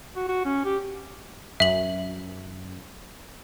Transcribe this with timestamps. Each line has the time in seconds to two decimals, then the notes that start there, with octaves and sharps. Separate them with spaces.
0.16 F#4
0.28 F#4
0.45 C#4
0.65 G4
1.60 F#2 E5 F#7